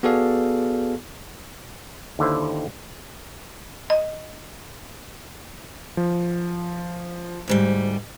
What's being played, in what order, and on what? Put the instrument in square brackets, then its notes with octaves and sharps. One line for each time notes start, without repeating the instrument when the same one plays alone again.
[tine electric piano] B3 F#4 G#4 A4 D5 F5
[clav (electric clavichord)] D#2 D3 E4 C5
[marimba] D#5
[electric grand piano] F3
[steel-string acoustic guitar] D2 G#2 G3